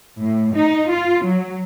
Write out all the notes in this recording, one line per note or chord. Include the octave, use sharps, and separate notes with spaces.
A2
D#4
F4
F#3